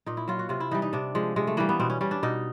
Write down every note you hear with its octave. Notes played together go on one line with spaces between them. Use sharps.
A#2 D#4
E4
F#3 F4
F#4
C3 F4
E4
E3 G3 D#4
D#4
C3 D4
F3 G#3
C3 G#3
A3
E3 G3 A#3
B3
B2 C4
C#4
G3 C#4
D4
B2 D#4